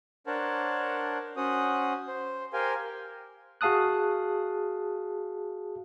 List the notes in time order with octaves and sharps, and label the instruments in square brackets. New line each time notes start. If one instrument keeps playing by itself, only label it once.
[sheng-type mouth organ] D4 A#4 C5 C#5 F#5 A5
C#4 F#4 C5 F#5 D#6
C5
G4 A#4 C5 F5 G5 G#5
[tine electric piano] F#4 G#4 F5 A5 D#6 F#6